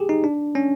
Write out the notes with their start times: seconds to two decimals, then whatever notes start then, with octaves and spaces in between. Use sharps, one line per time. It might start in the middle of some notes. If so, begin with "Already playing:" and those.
Already playing: G4 G#4
0.09 D#4
0.24 D4
0.55 C#4